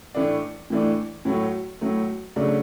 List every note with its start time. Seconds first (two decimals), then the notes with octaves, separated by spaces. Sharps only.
0.15 A2 E3 A3 D4
0.70 A2 E3 A3 D4
1.25 A2 F#3 A3
1.81 A2 F#3 A3
2.36 C#3 F#3 A3 D4